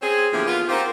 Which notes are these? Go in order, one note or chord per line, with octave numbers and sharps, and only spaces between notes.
C4 C#4 G#4
A#2 D3 E3 F3 B3 G4
B3 F4
C4 D#4 F4 G4 A#4 C5